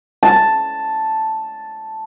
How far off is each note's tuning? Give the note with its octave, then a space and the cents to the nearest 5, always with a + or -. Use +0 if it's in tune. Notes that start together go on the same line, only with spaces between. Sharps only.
A5 +0